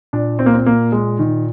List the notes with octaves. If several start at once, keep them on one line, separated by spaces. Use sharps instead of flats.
A#2 D4
C4
A#3
C4
A#3
G#3
D#3